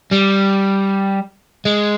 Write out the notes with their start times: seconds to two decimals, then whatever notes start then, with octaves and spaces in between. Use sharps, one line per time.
0.12 G3
1.65 G#3